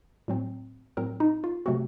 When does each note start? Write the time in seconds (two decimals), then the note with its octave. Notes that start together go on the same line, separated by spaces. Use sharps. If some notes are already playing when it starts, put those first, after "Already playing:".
0.28 A2 F#3 C4
0.97 A2 F#3 C4 A#4
1.20 D#4
1.44 F4
1.66 C3 F#3 A3 C4 F#4